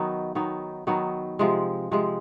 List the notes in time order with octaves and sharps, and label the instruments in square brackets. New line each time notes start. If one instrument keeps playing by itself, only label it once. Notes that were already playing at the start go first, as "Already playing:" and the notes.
Already playing: [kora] D#3 F#3 B3 D#4
D#3 F#3 B3 D#4
D#3 F#3 B3 D#4
C3 F3 G#3
C3 F3 G#3